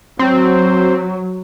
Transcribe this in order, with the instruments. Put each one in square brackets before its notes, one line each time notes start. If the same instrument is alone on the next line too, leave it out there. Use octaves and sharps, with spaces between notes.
[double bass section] F#3 [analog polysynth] C4